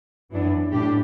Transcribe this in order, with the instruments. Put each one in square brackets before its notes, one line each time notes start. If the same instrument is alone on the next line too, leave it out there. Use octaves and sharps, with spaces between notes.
[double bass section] F#2 [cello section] E3 B3 D4
[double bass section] A2 [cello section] D4 G4